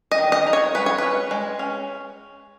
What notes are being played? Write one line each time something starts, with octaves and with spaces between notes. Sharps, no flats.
D#5
D#3
D#5
D#4
C#5
G#3 B4
C#5
C#4 B4
G#3
C#4